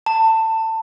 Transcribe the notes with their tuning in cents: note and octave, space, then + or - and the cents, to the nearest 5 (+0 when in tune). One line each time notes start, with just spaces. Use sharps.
A5 +25